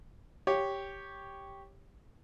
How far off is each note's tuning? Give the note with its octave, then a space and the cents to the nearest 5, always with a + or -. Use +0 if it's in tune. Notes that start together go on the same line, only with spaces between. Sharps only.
G4 +0 C#5 +0